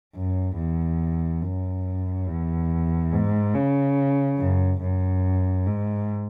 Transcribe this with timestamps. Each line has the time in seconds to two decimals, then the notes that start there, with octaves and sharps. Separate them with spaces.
0.15 F#2
0.57 E2
1.42 F#2
2.27 E2
3.12 G#2
3.55 C#3
4.39 F#2
4.81 F#2
5.67 G#2